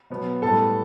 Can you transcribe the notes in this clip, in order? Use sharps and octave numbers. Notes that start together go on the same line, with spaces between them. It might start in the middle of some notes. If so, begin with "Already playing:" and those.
B2 F#3 B3
A2 G3 B3 A4 A5